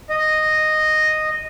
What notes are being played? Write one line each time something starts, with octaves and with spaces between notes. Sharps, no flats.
D#5